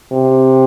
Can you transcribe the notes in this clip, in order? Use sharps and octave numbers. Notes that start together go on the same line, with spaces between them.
C3